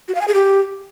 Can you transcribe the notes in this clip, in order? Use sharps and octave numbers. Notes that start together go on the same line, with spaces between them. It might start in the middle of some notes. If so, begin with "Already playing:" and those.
F#4
F5
G#5
G#4
G4